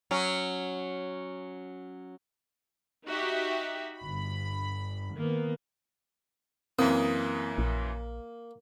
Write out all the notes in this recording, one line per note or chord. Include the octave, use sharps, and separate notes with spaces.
F#3 C#4
D#4 F#4 G4 E5
G1 B5
D#3 A#3 B3
F#2 E3 A#3 C4 D#6
A#1